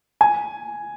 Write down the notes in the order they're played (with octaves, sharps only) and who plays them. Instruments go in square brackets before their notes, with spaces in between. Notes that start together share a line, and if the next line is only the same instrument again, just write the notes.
[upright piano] G#5